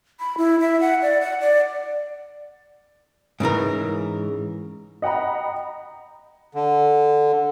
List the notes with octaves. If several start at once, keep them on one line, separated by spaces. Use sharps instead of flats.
B5
E4
E5
F#5
D5
F#5
D5
G#2 C#3 E3 A#4
D#5 F#5 G5 A#5 B5
D3